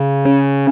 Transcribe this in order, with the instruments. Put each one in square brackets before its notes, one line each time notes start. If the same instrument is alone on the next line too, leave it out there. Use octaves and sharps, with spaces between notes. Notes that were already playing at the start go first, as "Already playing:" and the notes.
Already playing: [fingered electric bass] C#3
C#4